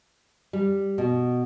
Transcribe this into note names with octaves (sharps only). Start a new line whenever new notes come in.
G3
B2